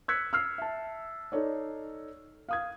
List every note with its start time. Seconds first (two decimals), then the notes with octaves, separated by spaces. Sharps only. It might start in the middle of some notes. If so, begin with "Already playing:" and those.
0.08 E6 F#6 G#6 B6 C#7
0.33 E6 F6 C7
0.58 E5 A5
1.32 D#4 A4 C#5 D5
2.49 F5 D#6 G#6